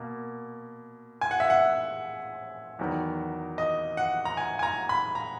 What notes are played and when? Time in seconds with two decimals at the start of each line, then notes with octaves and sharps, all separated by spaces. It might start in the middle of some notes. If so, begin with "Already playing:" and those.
Already playing: B2 A#3
1.21 G#5
1.31 F#5
1.40 E5
1.50 F#5
2.79 E2 D#3 F#3 B3
3.58 D#5
3.97 F#5
4.25 A#5
4.37 G#5
4.59 G#5
4.63 A#5
4.89 B5
5.15 A#5